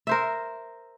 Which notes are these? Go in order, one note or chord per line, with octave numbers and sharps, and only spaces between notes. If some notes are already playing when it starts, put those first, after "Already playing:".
A#4 C5 E5